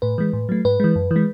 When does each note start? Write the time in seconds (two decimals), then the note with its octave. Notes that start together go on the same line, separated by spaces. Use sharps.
0.02 A2 B4
0.18 E3 G#3
0.33 A2
0.49 F#3 A3
0.65 G#2 B4
0.80 E3 G#3
0.95 F#2
1.11 E3
1.16 G#3